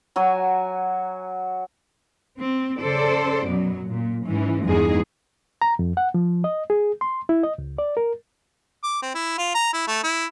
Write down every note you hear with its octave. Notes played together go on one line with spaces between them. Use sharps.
F#3 F#4 G#5
C4
C#3 A4 C5 D5
F#2 B2 F#3
A#2
G#2 E3 C#4
E2 G2 G#3 D#4 G#4
A#5
F2
F#5
F3
D#5
G#4
C6
E4
D#5
C#2
D5
A#4
D6
C4
E4
F4
A#5
E4
A3
E4